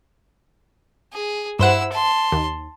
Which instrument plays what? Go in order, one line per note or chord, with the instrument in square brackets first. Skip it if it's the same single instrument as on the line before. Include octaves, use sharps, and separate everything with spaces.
[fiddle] G#4
[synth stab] G2 C5 F#5 [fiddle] E4 E6
[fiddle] A5 C6
[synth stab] D#2